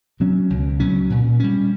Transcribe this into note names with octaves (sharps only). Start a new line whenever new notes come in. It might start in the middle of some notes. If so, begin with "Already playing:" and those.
B2 F#3 C#4
C#2
B2 F#3 C#4
A#2
G3 C#4